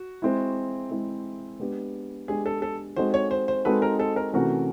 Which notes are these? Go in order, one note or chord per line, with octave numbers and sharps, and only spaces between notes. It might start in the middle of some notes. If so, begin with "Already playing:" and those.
Already playing: F#4
G#3 C4 E4
G#3 C4 E4
G#3 B3 D4 G4
G#3 B3 D4 G4 G#4
A4
A4
G#3 C4 D#4 F#4 A4 C5
C#5
C5
C5
G#3 C4 D#4 F#4 A4 B4
A#4
A4
A#4
C3 E3 A3 C#4 F#4 A#4